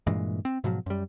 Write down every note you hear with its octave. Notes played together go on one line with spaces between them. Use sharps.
G2 A#2 E3 G#3
C4
G#2 B2 F3 F#3
F#2 G3